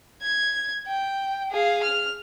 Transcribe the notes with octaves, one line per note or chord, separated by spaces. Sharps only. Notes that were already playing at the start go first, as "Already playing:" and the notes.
G#6
G5
G#4 F5
F6